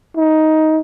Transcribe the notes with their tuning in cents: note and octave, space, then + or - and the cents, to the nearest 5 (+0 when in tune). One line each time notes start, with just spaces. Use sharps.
D#4 +10